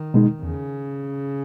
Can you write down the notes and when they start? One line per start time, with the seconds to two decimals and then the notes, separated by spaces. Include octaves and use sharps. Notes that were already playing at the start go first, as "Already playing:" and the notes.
Already playing: D#3
0.14 B2 G#3 D#4
0.42 E2 C#3